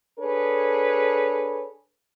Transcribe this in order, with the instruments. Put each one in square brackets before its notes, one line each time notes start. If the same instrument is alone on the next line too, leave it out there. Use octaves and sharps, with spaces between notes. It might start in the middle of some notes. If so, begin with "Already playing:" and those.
[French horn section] D4 G#4 A4 B4 C#5